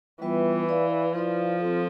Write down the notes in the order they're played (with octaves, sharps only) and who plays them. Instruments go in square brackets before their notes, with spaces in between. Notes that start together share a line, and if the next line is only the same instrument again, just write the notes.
[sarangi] E3 [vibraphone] G3 B3 F4 B4 E5
[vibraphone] E4 B4 D5 F5
[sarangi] F3 [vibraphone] E4 B4 D5 F5
[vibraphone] C4 F4 A4